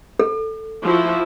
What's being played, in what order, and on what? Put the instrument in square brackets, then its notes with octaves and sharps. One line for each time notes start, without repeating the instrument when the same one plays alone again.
[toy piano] A4
[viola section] F3 E4 F#4